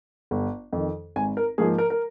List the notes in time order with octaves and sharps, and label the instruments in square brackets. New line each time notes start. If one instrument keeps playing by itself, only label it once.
[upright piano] G1
F2 D#3
G#1 G#5
A#4
G#2 F3 A#3 G#4
A#4
A#4